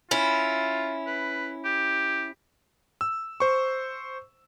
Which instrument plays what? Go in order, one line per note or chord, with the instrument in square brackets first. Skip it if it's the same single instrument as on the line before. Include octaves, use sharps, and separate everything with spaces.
[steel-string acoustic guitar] C#4 E4 [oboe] F4
[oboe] B4
G4
[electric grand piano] E6
C5 C#6